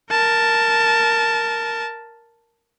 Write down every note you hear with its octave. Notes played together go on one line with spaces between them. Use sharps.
A#4 A5